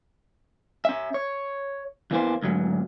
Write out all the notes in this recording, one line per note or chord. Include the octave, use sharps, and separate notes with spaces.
C#4 E5
C#5
E2 E3 A#3 C5
D2 G#2 F#3